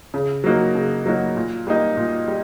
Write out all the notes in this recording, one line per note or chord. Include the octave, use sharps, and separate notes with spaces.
C#3
F#3 A#3 D#4 F#4
C#3
F#3 A#3 D#4 F#4
A#2
G3 A#3 D#4
A#2
G3